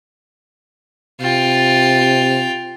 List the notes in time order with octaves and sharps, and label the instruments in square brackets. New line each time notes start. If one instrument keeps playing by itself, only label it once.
[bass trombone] C3 [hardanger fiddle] F4 G5